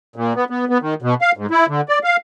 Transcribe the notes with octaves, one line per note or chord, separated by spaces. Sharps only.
A#2
B3
B3
B3
D#3
B2
F5
G#2
E4
D3
D5
F5